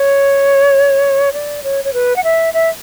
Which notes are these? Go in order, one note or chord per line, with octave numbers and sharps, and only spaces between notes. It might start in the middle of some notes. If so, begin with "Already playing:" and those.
Already playing: C#5
D5
C#5
C#5
B4
F#5
E5
E5